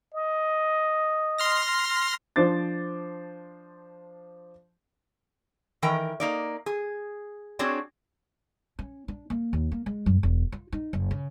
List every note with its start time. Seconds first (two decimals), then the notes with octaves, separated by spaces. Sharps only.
0.14 D#5
1.38 C6 F6 A#6
2.36 F3 D4 C5 D6 A6
5.82 D#3 E3 A#4 G5
6.20 A#3 D#4 D5
6.66 G#4
7.59 C4 D4 F#4 G#4 C#5 D5
8.79 C#4
9.08 D4
9.30 A#3
9.53 D#2
9.72 A#3
9.86 G#3
10.06 F#2
10.23 E1
10.52 F4
10.72 D#4
10.93 F#1
11.11 C#3